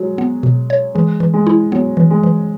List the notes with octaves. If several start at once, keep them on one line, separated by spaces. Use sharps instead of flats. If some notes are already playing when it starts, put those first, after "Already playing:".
Already playing: F#3 G#3 F#4
B3
B2
C#5
E3 G#3
E3
G#3
E4
F#3 B3
E3
G#3
E3